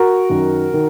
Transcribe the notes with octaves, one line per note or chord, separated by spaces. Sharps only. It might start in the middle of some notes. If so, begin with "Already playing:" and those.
Already playing: F#4 A#4
F#2 D#3
D#3